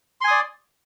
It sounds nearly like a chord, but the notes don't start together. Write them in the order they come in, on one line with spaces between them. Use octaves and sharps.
C6 G#5 D#6 D5